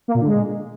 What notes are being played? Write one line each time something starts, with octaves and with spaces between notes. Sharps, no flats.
A#3
A#2
D3
G#3